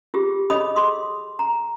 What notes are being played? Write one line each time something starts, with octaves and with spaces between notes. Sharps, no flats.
F4 G4 G#4
G#4 A4 C#5 D#5 B5 D#6
G#4 C6 D#6
A#5